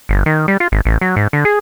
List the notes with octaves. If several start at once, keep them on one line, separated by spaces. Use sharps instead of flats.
G1
D#3
G3
F4
G#1
A1
F#3
G#2
D3
G#4